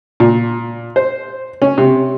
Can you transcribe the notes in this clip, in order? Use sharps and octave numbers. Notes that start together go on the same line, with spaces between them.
A#2
C5
C#4
C3